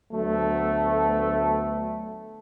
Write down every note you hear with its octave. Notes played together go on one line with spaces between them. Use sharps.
D2 F#3 A3 B3